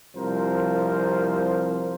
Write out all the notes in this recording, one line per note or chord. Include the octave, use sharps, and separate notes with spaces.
C2 F3 A#4 C5